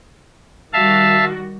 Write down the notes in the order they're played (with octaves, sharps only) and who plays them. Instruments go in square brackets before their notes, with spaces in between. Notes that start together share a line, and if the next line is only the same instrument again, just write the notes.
[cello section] D#3 G3 F#4 [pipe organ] E5 F5 A5